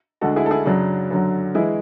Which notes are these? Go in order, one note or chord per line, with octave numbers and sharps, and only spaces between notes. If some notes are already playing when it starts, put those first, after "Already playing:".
D2 D3 G#3 F#4 A4
E4 G#4
A4
E4 G#4
F#2 C#3 F#3 D4
F#2 D3 F#3
E3 G#3 E4 G#4